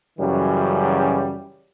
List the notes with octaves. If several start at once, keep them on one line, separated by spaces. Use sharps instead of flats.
F#2 C#3 E3 F#3 G3